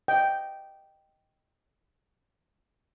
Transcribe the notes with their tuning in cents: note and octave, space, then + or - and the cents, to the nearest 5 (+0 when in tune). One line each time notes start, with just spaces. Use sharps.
D#5 +0 G5 -5